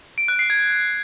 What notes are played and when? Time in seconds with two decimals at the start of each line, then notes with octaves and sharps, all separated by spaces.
0.18 D7
0.28 F#6
0.39 C7
0.50 G#6